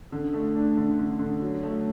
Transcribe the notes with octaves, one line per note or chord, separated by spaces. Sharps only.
D3
A3
D4
D3
D3
D3
F#3
A3